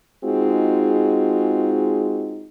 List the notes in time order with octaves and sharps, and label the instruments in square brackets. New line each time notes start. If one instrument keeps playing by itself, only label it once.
[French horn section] G#3 C4 D#4 F4 F#4 G#4